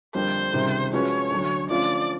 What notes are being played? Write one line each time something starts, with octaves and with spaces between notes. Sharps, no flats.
F2 D3 G3 A#3 C5
C#2 C3 D#3 G3
F3 G#3 C#4 F#4 B4 C#5
D2 D3 F#3
D3 F3 A3 C#4 F4 D5